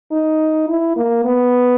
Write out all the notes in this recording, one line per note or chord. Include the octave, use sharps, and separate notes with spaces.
D#4
E4
A#3
B3